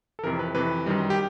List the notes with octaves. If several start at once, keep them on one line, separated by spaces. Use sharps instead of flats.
A4
F2 C3 E3 A#4
B4
F2 C3 E3 B4
F#2 D#3 G3
G4